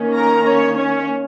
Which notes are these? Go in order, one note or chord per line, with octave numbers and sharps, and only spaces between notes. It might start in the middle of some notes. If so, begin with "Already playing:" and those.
Already playing: D#3 A#3 C#4
A#4 A#5
C#4 C#5
C#4 C#5